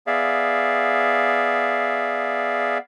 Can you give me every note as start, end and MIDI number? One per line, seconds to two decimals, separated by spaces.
0.07 2.78 59
0.07 2.78 68
0.07 2.78 74
0.07 2.78 76
0.07 2.78 77